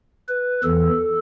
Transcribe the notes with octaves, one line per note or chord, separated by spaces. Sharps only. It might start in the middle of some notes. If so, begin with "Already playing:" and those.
B4
E2 E3 A4